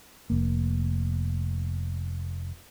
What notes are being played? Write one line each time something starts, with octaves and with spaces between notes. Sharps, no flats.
F1 A#3